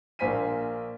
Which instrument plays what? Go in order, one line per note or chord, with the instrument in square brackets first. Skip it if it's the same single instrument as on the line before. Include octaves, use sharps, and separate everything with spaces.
[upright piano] A#1 A#3 C5 G#5 B6 D#7